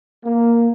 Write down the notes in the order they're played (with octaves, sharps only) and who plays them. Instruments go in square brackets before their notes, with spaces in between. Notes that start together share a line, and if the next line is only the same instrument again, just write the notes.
[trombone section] A#3